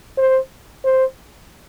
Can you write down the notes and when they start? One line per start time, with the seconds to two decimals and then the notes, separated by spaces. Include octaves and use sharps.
0.18 C5
0.85 C5